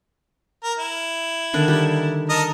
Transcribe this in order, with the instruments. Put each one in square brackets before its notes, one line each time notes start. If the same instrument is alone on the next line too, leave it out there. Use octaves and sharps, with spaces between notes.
[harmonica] A#4
E4
[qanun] D3 D#3 D4
G3 G4
[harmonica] A4 A#4 D#5